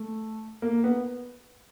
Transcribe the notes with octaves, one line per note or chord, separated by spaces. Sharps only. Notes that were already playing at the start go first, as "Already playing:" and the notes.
Already playing: A3
A#3
B3